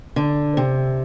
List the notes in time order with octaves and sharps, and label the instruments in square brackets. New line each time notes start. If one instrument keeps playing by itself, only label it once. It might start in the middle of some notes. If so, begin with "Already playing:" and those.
[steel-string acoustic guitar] D3
C3